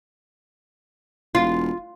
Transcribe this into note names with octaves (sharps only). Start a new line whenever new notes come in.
E1 F4